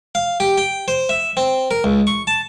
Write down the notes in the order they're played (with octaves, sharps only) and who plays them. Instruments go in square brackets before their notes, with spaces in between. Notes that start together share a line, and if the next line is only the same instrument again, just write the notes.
[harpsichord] F5
G4
G5
C5
E5
C4
A#4
C#2
C#6
A5